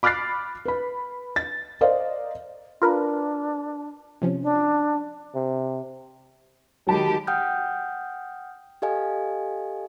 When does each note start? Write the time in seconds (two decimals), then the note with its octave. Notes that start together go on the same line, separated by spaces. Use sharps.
0.03 B5 D6 F6 F#6 A6 C7
0.65 B4 B5
1.36 A6
1.81 A#4 C5 D5 D#5 F5
2.82 D4 F4 A#4 B4
4.22 C3 F3 C#4
4.43 D4
5.35 C3
6.87 D#3 F#3 G#3 G4 A5 B5
7.27 F#5 G5 D#6 F6 G6
8.82 G4 A4 D#5 F5 G#5